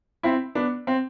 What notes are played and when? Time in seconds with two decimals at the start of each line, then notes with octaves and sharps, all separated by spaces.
0.23 C4 E4
0.55 B3 D4
0.87 C4